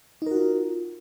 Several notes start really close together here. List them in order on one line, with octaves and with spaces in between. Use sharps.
D#4 A#4 F#4 F4